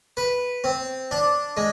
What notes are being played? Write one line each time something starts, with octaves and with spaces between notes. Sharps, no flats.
B4
C4
D4
G#3